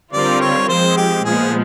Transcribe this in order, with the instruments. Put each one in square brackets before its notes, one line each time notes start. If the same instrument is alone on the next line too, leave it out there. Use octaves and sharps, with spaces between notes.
[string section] D3 G3 C4 F4 A#4 [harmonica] D5
[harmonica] C#5
[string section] F3 G#3 C4 [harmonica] C5
[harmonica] G4
[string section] A#2 F3 G#3 B3 [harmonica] G#4